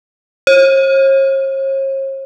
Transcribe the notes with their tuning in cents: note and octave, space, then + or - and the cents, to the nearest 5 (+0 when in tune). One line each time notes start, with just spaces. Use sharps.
C#5 -45